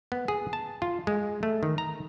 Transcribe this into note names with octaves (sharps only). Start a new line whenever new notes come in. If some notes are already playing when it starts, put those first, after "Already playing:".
B3
G#4
A5
F4
G#3
A3
D#3
A#5